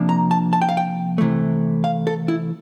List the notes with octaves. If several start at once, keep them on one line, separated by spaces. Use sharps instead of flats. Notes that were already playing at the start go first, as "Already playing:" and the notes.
Already playing: C3 F3 A#3 D4
A#5
A5
A5
G5
F5
G5
C3 E3 A3
F5
A4
E4